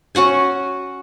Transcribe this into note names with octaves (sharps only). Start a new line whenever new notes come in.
C#4 F#4 F#5 G#5